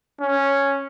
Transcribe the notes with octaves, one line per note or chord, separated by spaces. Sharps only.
C#4